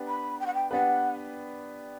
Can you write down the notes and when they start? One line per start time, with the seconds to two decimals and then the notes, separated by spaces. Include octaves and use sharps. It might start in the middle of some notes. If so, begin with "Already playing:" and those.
Already playing: B3 D4 G4 B4
0.08 B5
0.40 G5
0.46 F#5
0.54 G5
0.71 B3 D4 G4 B4 F#5